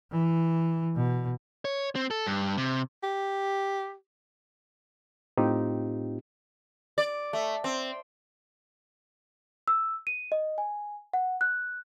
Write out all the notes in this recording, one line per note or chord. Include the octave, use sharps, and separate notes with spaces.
E3
B2
C#5
C4
A4
G2
C3
G4
A2 C4 D#4 F4 G4
D5
A3
C4
E6
D#7
D#5
G#5
F#5
F#6